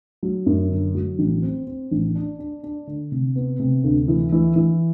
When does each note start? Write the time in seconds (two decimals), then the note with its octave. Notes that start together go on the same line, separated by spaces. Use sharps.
0.23 F#3
0.46 F#2
0.70 G1
0.95 F#3
1.19 A1
1.42 C4
1.67 C4
1.91 A1
2.15 D4
2.39 D4
2.63 D4
2.87 D3
3.12 C3
3.36 B3
3.59 C3
3.84 D2
4.08 E3
4.32 E3
4.56 E3